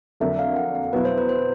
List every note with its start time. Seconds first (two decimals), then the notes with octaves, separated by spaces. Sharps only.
0.20 F2 D3 F#3 A#3 D4 E5
0.39 F5
0.56 F#5
0.75 F5
0.93 B2 F#3 B3 E4 B4
1.05 C5
1.18 B4
1.29 C5